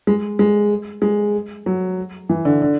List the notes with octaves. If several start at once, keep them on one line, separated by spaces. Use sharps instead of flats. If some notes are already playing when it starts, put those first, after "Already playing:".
G#3
G#3
G#3
F#3
E3
D3
D3